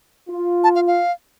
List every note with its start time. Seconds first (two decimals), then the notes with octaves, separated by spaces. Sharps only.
0.29 F4
0.64 A5
0.75 F5
0.87 F5